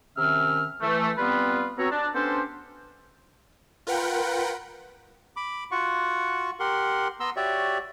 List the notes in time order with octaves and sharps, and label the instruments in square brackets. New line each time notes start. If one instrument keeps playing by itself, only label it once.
[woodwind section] C3 D#3 C#4 E5 F6
E3 A3
G3 B3 C4 F4 B4
B3 C4 F#4 A4 C#5 A#5
D4
B3 C#4 D4 G4 A4 C5
[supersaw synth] F4 A#4 B4 F#5 G5
[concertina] B5 D6
F4 F#4 F#5 C#6
G4 A#4 F#5 C6
B3 A#5 C6 E6
F#4 G4 C#5 D5 E5